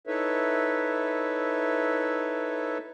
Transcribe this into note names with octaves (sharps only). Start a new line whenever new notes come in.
D#4 E4 A4 B4 C#5 E5